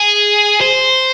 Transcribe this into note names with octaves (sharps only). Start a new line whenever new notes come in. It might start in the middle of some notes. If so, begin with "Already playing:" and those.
Already playing: G#4
C5